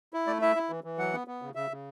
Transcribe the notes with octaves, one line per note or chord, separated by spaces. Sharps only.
E4
A3 D5
E4 E5
E4
E3
E3
F#3 F#5
B3
B3
C#3
C#3 E5
C#3